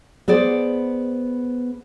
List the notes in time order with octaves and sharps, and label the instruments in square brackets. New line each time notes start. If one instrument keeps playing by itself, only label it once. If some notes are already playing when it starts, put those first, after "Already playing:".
[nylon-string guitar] B3 G#4 C5 D5